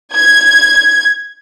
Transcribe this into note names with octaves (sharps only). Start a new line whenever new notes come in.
G#6